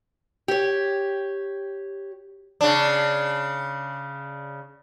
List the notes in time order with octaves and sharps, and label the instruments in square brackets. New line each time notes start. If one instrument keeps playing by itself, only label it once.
[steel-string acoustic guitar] G4 C#5
[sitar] C#3 D4